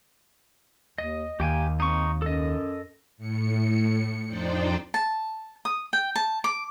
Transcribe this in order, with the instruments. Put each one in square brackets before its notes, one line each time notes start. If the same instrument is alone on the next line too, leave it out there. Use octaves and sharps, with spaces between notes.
[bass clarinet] D#2 [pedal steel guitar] D#5
[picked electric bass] D#2 [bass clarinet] A#3 [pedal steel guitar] G4 G5 G#5
[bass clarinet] C4 [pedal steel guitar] D#4 C#6
[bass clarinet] F#2 [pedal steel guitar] A4 D#5
[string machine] A2 C#7
F2 D4 D#4 C5 D5 G5
[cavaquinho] A5
D#6
G5
A5
D6